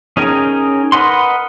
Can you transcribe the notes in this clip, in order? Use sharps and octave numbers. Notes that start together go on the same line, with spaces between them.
C#4 D#4 G#4 A#4 G5
A#4 B4 D#5 F#5 C6